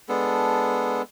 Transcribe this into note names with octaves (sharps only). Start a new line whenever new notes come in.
G#3 B3 D4 A4